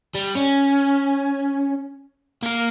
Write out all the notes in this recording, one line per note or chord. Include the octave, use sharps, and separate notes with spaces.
G3
C#4
A#3 A#4